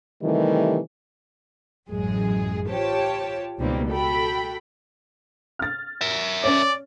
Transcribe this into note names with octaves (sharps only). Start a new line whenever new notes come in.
C3 D#3 E3 G3 A3
A1 F#2 G#3 G#4
F4 G4 C5 C#5 G5 A5
C#2 B2 D#3 G3 A#3 C4
F#4 A4 G5 B5
F6 A6
A#4 E5
C#4 C#5 D5